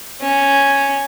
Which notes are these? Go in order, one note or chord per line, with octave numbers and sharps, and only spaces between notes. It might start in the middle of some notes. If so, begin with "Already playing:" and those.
C#4